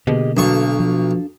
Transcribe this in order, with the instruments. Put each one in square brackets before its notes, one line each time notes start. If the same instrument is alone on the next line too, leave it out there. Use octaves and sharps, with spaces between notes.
[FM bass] B2 [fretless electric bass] D3 A#3 [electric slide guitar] G4 G#4 D#5
[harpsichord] B1 C#6 [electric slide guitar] D4 A4 F5
[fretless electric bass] F3